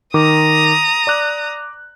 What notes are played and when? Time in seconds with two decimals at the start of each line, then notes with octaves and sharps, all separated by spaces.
0.14 D#3 A#5 D6 D#6
1.07 D5 D6 F#6